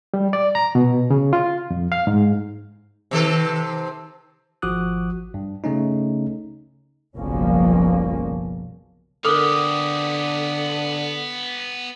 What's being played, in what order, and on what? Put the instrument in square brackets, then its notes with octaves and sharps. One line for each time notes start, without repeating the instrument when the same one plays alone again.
[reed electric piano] G3
D5
A#5
B2
C#3
F4
F2
F5
G#2
[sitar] C3 D#3 A4
[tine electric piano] G#1 F3 F#4 D6 D#6 F#6
G2
C#3 A3 C#4 D#4
[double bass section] F#1 B1 F3 G3 A#3 C#4
[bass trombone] D3 [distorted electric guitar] B3 G4 [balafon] A4 A#4 [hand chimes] D6 D#6